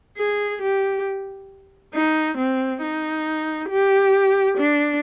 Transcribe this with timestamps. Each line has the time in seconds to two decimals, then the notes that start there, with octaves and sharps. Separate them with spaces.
0.17 G#4
0.62 G4
1.94 D#4
2.38 C4
2.82 D#4
3.69 G4
4.57 D4